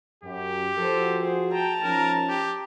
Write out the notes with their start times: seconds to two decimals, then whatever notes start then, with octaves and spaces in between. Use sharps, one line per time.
0.23 F#2 G4
0.76 F3 F#4 A4 C5
1.23 G#4 C5
1.53 G5 A5 A#5
1.83 F3 C#4 D#4 A#4
2.29 G4